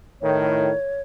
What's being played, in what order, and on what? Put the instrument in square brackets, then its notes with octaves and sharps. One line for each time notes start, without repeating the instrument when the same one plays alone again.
[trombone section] A2 D#3 [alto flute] C#5